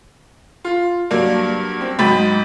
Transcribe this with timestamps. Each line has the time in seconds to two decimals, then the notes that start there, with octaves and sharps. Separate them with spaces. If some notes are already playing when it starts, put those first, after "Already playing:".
0.65 F4
1.11 G2 F#3 A#3 D4
1.81 C4
1.99 G#2 F#3 D#5 G5 B5 A6